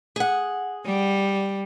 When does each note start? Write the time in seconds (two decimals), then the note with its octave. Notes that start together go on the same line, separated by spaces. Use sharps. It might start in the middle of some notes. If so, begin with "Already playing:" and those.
0.16 G#4 F#5
0.86 G3